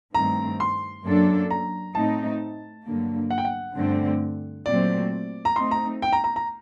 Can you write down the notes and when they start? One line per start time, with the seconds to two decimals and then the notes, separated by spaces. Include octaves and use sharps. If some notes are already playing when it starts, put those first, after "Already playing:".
0.14 G2 D#3 A3 C4 A#5
0.60 C6
1.05 F#2 F#3 A#3 D4 A4
1.50 A#5
1.95 A2 A3 C4 D#4 A5
2.86 G2 D3 F#3 A#3
3.30 F#5
3.38 G5
3.45 F#5
3.76 G2 D3 A3 C4
4.66 A#2 F#3 A3 C4 D5
5.45 A#5
5.56 A3 C4 D#4 C6
5.71 A#5
6.02 G5
6.13 A#5
6.24 A#5
6.36 A#5